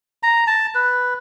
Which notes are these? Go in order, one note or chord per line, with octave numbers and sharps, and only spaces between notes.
A#5
A5
B4